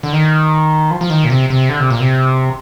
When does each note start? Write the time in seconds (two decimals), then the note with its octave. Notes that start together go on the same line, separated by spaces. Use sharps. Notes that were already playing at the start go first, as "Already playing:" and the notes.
0.03 D3
0.12 D#3
0.91 F3
1.01 F3
1.10 D#3
1.24 A#2
1.30 C3
1.50 C3
1.69 D3
1.80 C3
1.90 A#2
2.00 C3